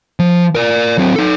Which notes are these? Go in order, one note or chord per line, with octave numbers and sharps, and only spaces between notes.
F3
A#4 D5
F#3 C4
D#4 A4